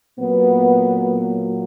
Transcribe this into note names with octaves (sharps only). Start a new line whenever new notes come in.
A#2 F#3 A#3 B3